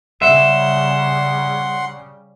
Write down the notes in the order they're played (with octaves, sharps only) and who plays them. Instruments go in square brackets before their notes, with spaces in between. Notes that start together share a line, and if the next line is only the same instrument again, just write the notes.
[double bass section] C#3 G3 [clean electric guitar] E5 [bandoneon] F#5 C6